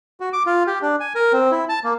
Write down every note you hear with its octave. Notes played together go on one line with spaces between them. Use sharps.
F#4
D6
F4
G4
D4
G#5
A#4
C4
E4
A5
A#3